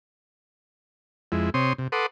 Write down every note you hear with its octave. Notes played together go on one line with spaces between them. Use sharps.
F2 G#3 E4
C3 C4 C#5 C6 D#6
C3
A4 B4 F#5 C6 D6 D#6